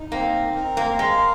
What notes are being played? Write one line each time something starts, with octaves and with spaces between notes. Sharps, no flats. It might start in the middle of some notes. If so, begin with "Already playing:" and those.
Already playing: D#4
A#3 C4
A#4
A#3
G#3 F5